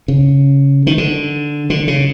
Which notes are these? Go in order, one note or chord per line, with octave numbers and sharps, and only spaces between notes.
C#3
D#3
D3
D3
C#3